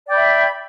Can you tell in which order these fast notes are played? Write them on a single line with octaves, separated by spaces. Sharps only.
D5 G5 B5 E5